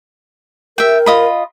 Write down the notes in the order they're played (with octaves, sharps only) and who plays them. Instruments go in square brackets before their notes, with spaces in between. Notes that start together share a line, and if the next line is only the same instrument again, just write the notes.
[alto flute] A#4 [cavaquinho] E5 G5
[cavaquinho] F4 D#5 B5